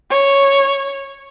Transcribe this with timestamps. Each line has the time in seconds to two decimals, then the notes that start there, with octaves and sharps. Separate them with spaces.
0.11 C#5